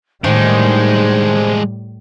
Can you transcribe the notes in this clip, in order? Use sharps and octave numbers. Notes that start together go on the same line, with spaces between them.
A2 D#3 G3 G#3 D4 C5